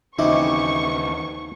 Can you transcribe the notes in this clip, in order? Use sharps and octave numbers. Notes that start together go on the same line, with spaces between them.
D#2 C#3 E3 C4 D#4 E4 G4 C#6